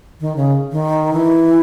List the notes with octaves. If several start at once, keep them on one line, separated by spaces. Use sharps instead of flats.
D#3
C#3
D#3
E3